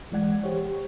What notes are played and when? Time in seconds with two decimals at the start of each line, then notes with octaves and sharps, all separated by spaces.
0.12 E3 G#3 D5 F#5 G#6
0.43 G4 C5 C#5